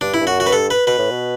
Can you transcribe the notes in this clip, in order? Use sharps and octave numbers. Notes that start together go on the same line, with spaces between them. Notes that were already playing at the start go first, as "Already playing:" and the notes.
G2 D4
E4
G2
F#2 F#4
F#4
B4
G2 A4
B4
B2 B4
A2
B2